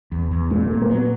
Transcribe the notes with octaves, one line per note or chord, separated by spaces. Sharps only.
E2
E2
A#2 G#3
G#3
A#2 A3
A#3
F#3 B3